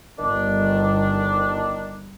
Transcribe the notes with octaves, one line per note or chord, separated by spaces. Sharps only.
G1 D#3 D4